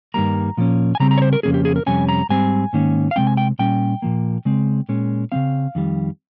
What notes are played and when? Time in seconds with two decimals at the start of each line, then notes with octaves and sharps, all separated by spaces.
0.14 G2 D#3 G3 A#3 A#5
0.57 A#2 F3 A#3 C#4
0.95 G#5
1.00 C#3 G3 C4 A#5
1.11 A#5
1.18 C#5
1.22 C5
1.33 A#4
1.43 F2 C#3 G3 A#3 C#4 G#4
1.54 G4
1.65 G#4
1.76 A#4
1.86 F2 C3 G3 C#4 G#5
2.09 A#5
2.29 G#2 G3 C4 G#5
2.73 G#2 D#3 A#3 C#4
3.11 F5
3.16 C3 D#3 G#3 C4 G5
3.27 G#5
3.37 G5
3.59 A#2 G3 C#4 G5
4.02 A#2 F3 A#3
4.45 C#3 G#3 C4
4.89 A#2 G#3 C#4
5.32 C#3 G3 C4 F5
5.75 F2 D#3 G3